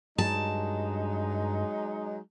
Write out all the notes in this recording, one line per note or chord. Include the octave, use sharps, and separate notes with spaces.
G2 F#3 G#3 D#4 A5